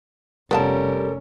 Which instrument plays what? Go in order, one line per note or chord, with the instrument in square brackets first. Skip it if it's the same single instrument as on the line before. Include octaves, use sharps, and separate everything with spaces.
[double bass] F1 C#4 [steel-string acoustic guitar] G3 [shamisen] B3 F4 A5 [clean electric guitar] A4 A#4